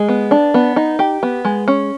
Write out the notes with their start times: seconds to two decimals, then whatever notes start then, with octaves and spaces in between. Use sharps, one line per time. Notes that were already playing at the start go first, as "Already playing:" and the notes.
Already playing: G#3
0.09 B3
0.31 D4
0.54 B3
0.76 D#4
0.99 G4
1.23 B3
1.45 G#3
1.68 C#4